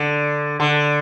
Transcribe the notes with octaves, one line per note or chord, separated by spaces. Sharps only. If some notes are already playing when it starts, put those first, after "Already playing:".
Already playing: D3
D3